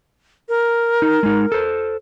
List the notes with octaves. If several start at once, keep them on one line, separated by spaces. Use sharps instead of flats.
A#4
D#4
G#3 D#4
A4 C5